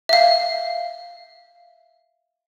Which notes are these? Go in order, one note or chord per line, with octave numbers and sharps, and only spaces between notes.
E5 F5